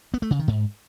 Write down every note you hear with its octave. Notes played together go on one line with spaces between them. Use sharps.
B3
A3
C#3
D#3
G#2